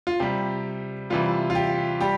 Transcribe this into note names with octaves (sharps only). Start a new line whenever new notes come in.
F4
C3 G3 G4
C3 E3 G3 F4
F4
G4
G3 G4